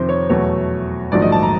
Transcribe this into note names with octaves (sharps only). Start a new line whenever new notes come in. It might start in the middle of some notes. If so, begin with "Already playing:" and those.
Already playing: F2 C3 D#3 C5
C#5
E2 B2 F#3 A3 C#5
A#1 G#2 D#3 F#3 A3 D5
D#5
A5
A#5